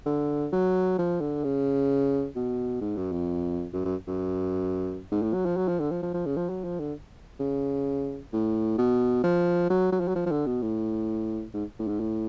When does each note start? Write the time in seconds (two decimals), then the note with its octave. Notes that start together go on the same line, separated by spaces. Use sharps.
0.06 D3
0.53 F#3
0.98 F3
1.21 D3
1.44 C#3
2.36 B2
2.81 G#2
2.97 F#2
3.12 F2
3.73 F#2
3.85 F#2
4.08 F#2
5.12 G#2
5.22 A2
5.34 F#3
5.45 F3
5.57 F#3
5.68 F3
5.80 D3
5.91 F3
6.03 F3
6.14 F3
6.26 C#3
6.37 F3
6.49 F#3
6.64 F3
6.80 D3
7.40 C#3
8.33 A2
8.78 B2
9.24 F3
9.70 F#3
9.92 F#3
10.00 F3
10.08 F#3
10.15 F3
10.26 F3
10.31 D3
10.46 B2
10.62 A2
11.54 G#2
11.79 A2
11.88 G#2
12.00 A2